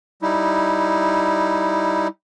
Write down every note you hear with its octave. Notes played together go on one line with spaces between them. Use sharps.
G3 D#4 E4